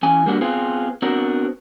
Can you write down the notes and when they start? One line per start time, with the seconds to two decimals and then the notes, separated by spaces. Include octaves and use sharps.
0.03 E3 C#4 G#5
0.26 G3 A#3 B3 D4 F#4
0.41 B3 C4 F4 G#4
1.02 B3 C4 D4 F#4 A#4